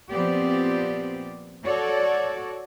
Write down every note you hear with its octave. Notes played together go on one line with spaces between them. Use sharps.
A#2 F3 B3 C4 G4 D5
F#4 A4 C#5 D5